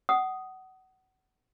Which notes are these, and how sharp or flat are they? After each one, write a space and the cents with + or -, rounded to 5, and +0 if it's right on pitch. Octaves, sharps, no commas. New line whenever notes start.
F#5 +25 D#6 +0